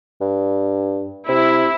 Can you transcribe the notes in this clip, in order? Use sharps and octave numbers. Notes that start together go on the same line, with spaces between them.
G2
C3 E4